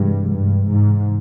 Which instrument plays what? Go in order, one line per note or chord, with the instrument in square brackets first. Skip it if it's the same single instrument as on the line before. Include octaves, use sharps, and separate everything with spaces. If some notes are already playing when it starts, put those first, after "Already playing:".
Already playing: [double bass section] G2 [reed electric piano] C3 E3 G#3
[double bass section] G2
G#2